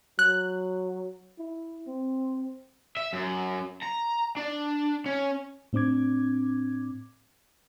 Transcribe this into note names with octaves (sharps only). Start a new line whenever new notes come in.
F#3 F#6
E4
C4
E5
F#2
A#5
D4
C#4
A2 C4 D4 D6 G#6